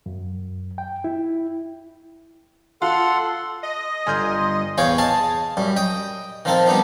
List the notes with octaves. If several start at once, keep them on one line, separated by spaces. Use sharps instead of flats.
F#2
G5
E4
F4 A4 F#5 C6
D#5
G1 G#5 C6 F6 G6
E2 G#4 C#5 F5 G5
G#4 D#5 F5 G#5 A5
F#2 G3
D#5 G5 D#6
D#3 F3 C4 A4 A#4
G3 B3 D4 D#4